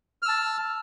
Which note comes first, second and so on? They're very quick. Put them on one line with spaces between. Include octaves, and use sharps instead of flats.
F6 E6 A5